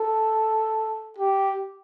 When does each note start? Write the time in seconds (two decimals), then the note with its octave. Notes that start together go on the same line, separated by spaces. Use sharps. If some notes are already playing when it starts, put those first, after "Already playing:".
Already playing: A4
1.18 G4